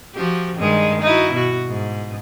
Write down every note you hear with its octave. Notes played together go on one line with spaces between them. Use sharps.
F3 F#4 G4
G2 D#3 G#3
D#4 E4 F#4
B2 F#4
G#2